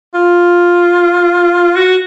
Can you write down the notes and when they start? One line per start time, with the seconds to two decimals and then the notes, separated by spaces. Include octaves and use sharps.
0.15 F4
1.76 F#4